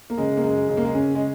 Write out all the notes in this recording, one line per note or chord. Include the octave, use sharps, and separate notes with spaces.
A#3
C#3 G#3
A#3
F#2 G#3
C#3 G#3
A#3
G#3
C#3 C#4
G#3